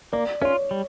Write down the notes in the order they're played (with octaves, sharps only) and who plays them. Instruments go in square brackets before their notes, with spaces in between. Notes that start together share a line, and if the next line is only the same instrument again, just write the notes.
[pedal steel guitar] A#3 [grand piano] D5
[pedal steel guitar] C#4 F4 [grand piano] C#5
[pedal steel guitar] G3